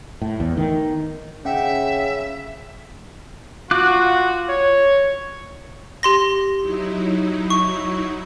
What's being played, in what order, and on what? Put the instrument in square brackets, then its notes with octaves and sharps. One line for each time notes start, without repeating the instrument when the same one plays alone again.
[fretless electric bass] A2
E2
D#3
[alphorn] C#3 [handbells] C#4 F#5 G5 [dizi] E5
[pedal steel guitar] F4 D6 F#6 [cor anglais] F#4
[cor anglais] C#5
[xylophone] G4 C6 A#6
[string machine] F#3 D#4 E4
[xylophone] C#6